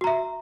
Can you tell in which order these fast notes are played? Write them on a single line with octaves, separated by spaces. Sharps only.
F#4 A#5 E5